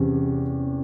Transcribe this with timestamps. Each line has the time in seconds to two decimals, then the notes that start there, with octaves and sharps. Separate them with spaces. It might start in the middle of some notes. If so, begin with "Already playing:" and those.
Already playing: E2 C3 C#4